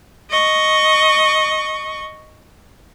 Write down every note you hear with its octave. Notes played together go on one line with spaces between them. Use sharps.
D#5 C#6